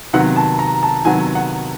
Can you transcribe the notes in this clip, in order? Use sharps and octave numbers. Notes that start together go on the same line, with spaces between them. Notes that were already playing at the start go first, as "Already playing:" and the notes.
C3 D#3 F#3 B3 F#5
A5
A#5
A5
C3 D#3 F#3 B3 G#5
F#5